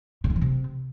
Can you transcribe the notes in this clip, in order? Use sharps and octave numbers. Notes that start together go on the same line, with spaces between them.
C#3
D3
E3
C3